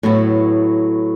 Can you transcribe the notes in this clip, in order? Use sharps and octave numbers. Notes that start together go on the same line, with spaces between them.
A2 F#3 B3 E4